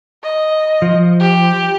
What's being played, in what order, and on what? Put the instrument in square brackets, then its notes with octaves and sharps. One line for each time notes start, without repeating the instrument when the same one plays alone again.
[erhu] D#5
[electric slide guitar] F3
[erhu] G4